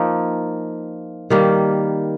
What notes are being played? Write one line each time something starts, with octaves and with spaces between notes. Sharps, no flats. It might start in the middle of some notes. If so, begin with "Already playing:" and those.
Already playing: F3 A#3 D#4
D#3 G3 A#3